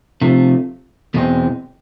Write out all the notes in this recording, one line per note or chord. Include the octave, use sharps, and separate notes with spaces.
C3 F3 A3
E2 B2 G#3 C4